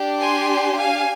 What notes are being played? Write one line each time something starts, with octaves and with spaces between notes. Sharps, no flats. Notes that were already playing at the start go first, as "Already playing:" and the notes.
Already playing: D4 G4
G#5 C6
F5 G#5